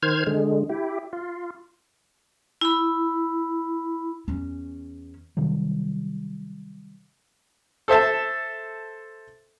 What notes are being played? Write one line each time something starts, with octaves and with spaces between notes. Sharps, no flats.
D#3 C5 F6 G#6
D3 G#3
E4 G4
F4
E4 B5
E2 C#4
C3 D#3 F#3 G3
A4 C5 E5 A5